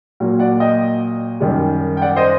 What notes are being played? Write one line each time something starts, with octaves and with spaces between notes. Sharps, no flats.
A#2 F#3 A#3
D5 F#5
D#5 G5
F#2 D#3 G3
G5
D5 F#5
C5 D#5